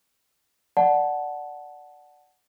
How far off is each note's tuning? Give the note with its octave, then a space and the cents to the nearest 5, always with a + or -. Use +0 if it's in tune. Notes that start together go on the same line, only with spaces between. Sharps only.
D5 +0 F#5 +0 A5 -15